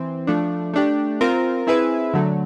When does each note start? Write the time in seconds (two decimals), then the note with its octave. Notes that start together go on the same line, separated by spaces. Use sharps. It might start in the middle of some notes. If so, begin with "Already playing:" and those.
Already playing: E3 C4
0.27 F3 A3 D4
0.74 A3 D4 G4
1.21 C4 F4 A#4
1.67 C4 E4 G#4 B4 E5
2.13 D3 F#3 A3